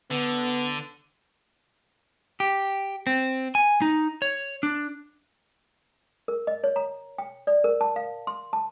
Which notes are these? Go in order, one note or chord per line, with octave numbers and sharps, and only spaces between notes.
D3 B3
G4
C4
G#5
D#4
C#5
D4
A#4
D#5
C#5
A#5
G5
D5
A#4
A5
F5
C6
A5